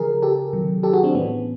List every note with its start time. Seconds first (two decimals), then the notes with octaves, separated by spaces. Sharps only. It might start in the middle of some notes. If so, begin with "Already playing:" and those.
Already playing: C#3 F3 G#4 A#4
0.22 G4 A4
0.53 C3 D#3 F#3
0.83 G4 A4
0.93 F#4 G#4
1.04 C4 D4
1.15 A2 E3 B3 C#4